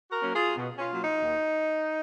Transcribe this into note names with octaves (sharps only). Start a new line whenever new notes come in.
F#4 A#4
F#3 A#3 C#4
F4 G#4
B2
C#4 F4
F#3 A#3 C#4
D#4
D#2